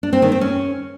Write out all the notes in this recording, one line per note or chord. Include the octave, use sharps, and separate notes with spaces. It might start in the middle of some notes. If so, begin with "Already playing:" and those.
D4
C4
D#3
C4
C#4